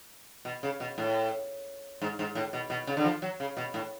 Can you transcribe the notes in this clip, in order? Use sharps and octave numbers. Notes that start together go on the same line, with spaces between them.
B2
C#3
B2
A2
G#2
G#2
A2
B2
B2
C#3
D3
F3
F#3
C#3
B2
A2